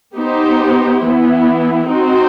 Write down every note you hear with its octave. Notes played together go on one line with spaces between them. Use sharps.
B3 D#4 G4 C5
E3 B3 E4
C4 D#4 F#4 C5